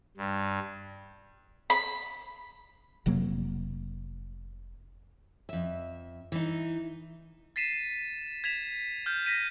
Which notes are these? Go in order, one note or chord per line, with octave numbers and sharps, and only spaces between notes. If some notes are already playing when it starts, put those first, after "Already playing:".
G2
B5
F1 C3 F#3 A#3
F2 E5
E3 D#4
A6 B6 C7 D#7 E7
G#6 B6 E7 F7
F6 G6
A#6 B6 D#7